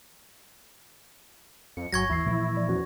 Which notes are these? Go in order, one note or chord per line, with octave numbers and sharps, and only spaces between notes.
F2 C#7
G1 G2 F#3 G#5 C#6 G#6 A#6
D#2 E3 E4 C7
A#2 E3 F3
F3 D5
E2 F3 C#4 F#4